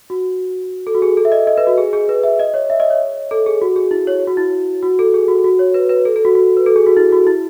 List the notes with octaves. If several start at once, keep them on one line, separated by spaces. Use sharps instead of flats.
F#4
A4
F#4
G#4
A4
E5
D#5
D#5
B4
F#4
G#4
G#4
B4
E5
D#5
C#5
E5
D#5
C#5
A4
G#4
F#4
G#4
E4
C#5
F#4
E4
F#4
A4
G#4
F#4
F#4
C#5
B4
B4
A4
A4
F#4
F#4
B4
A4
G#4
F#4
E4
F#4
E4